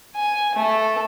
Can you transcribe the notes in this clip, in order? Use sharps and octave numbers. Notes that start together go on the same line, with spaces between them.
G#5
A3 A4